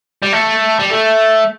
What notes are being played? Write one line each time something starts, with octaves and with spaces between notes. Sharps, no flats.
G3
A3
G3
A3